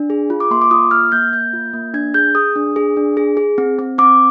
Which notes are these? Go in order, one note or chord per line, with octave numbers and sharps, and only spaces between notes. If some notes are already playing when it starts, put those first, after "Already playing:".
Already playing: D4
G#4
F4
D6
A#3 C6
D6
F4 D#6
A#3 F6
A#3 G6
A#3 G6
F4
A#3
D4 G#6
G#4 G6
G#4 D#6
D4
G#4
D4
G#4
G#4
C4
C4
C4 D6